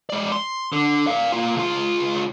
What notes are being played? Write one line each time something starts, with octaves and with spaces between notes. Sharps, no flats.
G#3 D5
C6
D3
D5 F5
A#3 F4
C#2 F4